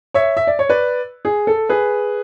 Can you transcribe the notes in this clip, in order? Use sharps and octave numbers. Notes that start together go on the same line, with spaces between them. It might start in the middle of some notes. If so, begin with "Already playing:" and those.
C#5 E5
E5
D5
C#5
B4 D5
G#4
A4
G#4 B4